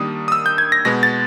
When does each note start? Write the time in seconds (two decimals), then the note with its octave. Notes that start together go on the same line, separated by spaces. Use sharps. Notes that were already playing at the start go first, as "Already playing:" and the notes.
Already playing: D#3 G3 A#3 D4 D#6
0.28 D#6
0.32 E6
0.46 G6
0.58 G#6
0.72 A#6
0.85 B2 G#3 B3 A#6
1.03 A6